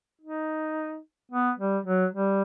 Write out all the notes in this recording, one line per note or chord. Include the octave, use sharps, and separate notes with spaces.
D#4
B3
G3
F#3
G3